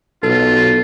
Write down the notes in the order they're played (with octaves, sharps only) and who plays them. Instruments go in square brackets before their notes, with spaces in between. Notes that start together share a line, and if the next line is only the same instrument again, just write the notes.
[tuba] B1 [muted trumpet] F4 [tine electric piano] A4